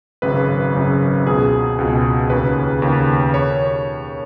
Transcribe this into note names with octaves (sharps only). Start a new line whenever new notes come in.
G#1 F#2 C#3 B4
G#1 F#2 C#3
C#2 B2 G#4
C#2 B2
D#2 C#3 B4
D#2 C#3
C#5